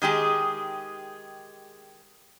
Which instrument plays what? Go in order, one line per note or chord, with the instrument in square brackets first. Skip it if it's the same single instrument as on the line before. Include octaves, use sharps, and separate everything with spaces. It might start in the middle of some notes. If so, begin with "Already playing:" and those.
[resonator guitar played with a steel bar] D#3 G#3 G4 G#4